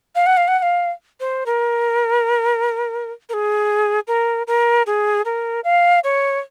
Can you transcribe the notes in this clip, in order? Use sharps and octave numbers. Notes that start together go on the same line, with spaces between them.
F5
F#5
F5
F#5
F#5
F5
C5
A#4
A#4
G#4
A#4
A#4
G#4
A#4
F5
C#5